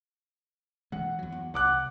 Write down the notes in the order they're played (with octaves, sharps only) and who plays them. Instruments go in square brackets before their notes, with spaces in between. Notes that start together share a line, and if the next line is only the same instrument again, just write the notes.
[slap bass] E3 G#3 [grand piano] F#5
[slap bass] E2 F#3
E2
[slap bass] C2 [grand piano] F#5 D6 F#6